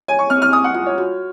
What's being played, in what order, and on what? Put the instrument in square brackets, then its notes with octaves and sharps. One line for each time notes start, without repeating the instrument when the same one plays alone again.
[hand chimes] C#5 [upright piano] G#5
[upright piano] C#6
[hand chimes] C4 [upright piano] F6
[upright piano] F6
[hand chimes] G#5 [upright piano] D#6
[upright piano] F#5
[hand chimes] F4
[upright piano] C#5
[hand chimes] F#4